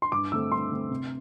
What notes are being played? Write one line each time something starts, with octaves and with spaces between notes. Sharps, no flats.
C6
G2 D6
D3 A3 C4 E6
G2 C6
D3 A3 C4
C3